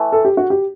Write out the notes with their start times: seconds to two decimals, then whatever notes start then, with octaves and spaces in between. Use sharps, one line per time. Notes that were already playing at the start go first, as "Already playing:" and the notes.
Already playing: E3 A3
0.12 A4
0.25 G4
0.37 F#4
0.50 G4